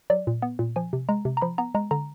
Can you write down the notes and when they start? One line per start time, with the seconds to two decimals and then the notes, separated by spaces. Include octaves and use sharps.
0.10 F#3 D5
0.27 A#2
0.42 B3
0.59 A#2
0.76 F3 G#5
0.93 C3
1.09 G#3 A#5
1.25 C3
1.37 A#5
1.42 F3 B5
1.58 B3 A#5
1.75 G#3 A#5
1.91 D3 A#5